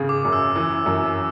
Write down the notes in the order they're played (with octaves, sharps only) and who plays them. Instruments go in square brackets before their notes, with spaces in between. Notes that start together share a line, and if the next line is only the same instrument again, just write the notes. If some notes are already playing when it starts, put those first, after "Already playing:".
Already playing: [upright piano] G#1 C#3 G#3
[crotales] D6
[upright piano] F#2
[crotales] E6
[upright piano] E3
F#2